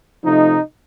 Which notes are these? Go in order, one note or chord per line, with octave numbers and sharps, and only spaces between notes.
C3 F3 A3 D#4